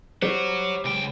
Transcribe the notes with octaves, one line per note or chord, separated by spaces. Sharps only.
G3 C5 C#5 F#5
C#2 G5